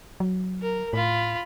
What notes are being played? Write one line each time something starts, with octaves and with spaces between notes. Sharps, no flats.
F#3
A#4
A2 F4 B5